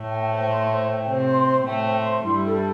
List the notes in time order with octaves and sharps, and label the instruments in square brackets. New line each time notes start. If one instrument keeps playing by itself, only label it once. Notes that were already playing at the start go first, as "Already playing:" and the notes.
Already playing: [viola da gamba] A2 A3
[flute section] G5
C5
C6
C5
G5
[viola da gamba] C3 C4 [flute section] C5
[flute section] C6
C5
[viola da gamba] A2 A3 [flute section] G5
[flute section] C5
C6
[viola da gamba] G2 G3 [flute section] E4
[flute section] A4